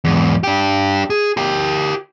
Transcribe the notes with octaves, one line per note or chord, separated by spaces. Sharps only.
E2 G#2
D4 G4
G#4
G4 A#4